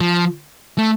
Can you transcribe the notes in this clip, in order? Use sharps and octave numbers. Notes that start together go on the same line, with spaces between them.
F3
A3